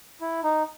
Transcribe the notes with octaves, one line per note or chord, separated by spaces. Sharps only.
E4
D#4